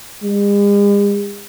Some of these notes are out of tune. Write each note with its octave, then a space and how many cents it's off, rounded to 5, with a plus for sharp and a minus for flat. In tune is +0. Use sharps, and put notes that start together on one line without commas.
G#3 -45